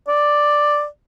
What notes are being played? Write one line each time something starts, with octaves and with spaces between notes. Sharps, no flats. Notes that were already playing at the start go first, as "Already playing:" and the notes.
D5